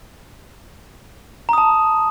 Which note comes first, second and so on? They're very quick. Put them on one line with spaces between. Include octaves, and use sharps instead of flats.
A#5 D#6 A5